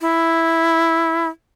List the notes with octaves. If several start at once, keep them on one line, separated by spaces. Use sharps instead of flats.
E4